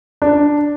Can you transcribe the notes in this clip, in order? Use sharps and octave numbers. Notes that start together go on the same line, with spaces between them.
D4